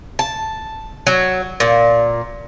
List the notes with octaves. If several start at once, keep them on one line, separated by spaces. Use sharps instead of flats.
A5
F#3
A#2